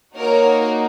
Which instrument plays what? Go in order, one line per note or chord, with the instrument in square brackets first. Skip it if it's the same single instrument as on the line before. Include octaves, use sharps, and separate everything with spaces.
[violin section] A#3 D#4 F#4 A#4 C#5